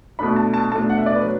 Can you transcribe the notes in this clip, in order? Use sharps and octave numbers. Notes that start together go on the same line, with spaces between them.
B2 A3 D4 B5
A5
A5
B2 A3 D4 A5
F#5
E5
D5
B4
F#3